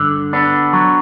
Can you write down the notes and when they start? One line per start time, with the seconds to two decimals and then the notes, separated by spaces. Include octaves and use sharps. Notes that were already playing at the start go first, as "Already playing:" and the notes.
Already playing: G2 D3
0.33 B3 D4
0.73 F#3